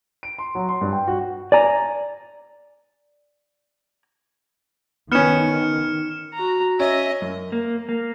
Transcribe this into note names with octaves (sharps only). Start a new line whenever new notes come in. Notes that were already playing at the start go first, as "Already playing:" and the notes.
D7
C6
F#3
C6
G2
G5
F#4
D5 G#5 A#5
D#3 B3 C#4 F6 C#7 E7
F#4 A#5
C#4 D#5 E5
F#2
A#3
A#3